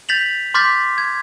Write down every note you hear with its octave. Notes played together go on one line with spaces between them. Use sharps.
G6 A6 B6 F7 F#7
C6 D6 F6 G6 A6 B6
G#6